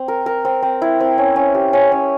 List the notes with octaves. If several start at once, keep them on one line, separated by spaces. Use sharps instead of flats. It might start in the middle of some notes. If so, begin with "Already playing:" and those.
Already playing: C4
A#4
A#4
C4
C4
E4
C4
C#4
C#4
G4
C#4
C#4